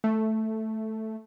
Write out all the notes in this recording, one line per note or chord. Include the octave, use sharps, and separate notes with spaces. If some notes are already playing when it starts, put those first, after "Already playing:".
A3